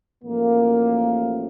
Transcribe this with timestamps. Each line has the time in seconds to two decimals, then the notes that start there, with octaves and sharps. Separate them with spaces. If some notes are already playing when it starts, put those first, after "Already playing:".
0.23 A1 A2 F3 A#3